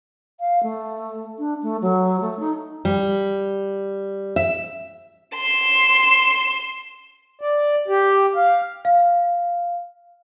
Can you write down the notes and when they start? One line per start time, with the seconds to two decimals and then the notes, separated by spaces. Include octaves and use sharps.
0.40 F5
0.63 A3
1.38 D4
1.63 A3
1.82 F#3
2.21 A3
2.40 D#4
2.85 G3
4.36 E5
5.35 C6 E7
7.41 D5
7.88 G4
8.36 F5
8.85 F5